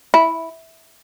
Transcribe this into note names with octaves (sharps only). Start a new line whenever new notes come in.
E4